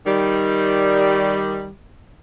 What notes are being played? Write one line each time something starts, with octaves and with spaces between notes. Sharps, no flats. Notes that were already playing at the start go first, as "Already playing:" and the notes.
D#3 G3